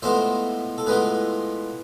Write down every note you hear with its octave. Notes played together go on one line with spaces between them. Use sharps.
A2 G#3 B3 F4 C5 E5
A4
A2 G#3 B3 F4 G#4 B4